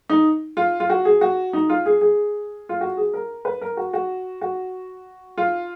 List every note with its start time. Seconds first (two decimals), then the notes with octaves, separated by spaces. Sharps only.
0.09 D#4
0.57 F4
0.80 F4
0.90 F#4
1.05 G#4
1.21 F#4
1.53 D#4
1.69 F4
1.86 G#4
2.01 G#4
2.69 F4
2.81 F#4
2.97 G#4
3.13 A#4
3.45 B4
3.61 A#4
3.77 F#4
3.93 F#4
4.41 F#4
5.38 F4